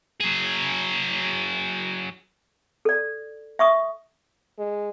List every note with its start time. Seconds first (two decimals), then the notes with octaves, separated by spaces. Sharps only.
0.20 F#3 G#4
2.85 A4 D5
3.59 E5 C#6 D#6
4.58 G#3